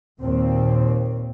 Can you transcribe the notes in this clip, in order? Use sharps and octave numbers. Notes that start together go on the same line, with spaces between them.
D#2 A#2 C4